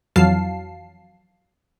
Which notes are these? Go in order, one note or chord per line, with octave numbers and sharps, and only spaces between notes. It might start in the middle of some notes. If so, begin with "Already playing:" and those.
F2 E3 F#3 F5 A5 C7